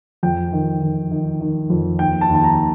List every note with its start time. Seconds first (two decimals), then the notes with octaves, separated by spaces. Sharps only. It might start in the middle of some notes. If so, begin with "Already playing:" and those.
0.23 F2 G5
0.53 D#3
0.82 D#3
1.11 D#3
1.41 D#3
1.70 F2
1.99 D#2 G5
2.21 A5
2.29 D#2
2.35 A5
2.44 A#5